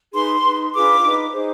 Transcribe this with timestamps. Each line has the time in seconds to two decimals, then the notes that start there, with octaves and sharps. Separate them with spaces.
0.13 D#4 G#4 B4 C6
0.43 D#4 B4
0.73 D4 F4 G#4 B4 D6
1.03 D#4 B4
1.32 D#4 G#4 C5